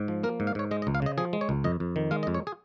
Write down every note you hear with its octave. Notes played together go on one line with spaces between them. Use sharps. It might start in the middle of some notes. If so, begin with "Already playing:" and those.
Already playing: G#2
F3
A#3 A#4
G#2
F5
G#2 C#5
G#3 D#5
D#5
C#2
F5
C#3 D#5
F3 G#4
G#3
C#5
C#2
F2 D#5
F2
D#3
G#3 F5
D#5
F2
C#5
G#4